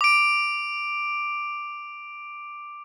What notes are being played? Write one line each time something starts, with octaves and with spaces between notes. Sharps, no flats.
D6 D7